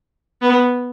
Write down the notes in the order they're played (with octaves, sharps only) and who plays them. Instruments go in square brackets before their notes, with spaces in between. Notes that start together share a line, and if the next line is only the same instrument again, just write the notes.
[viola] B3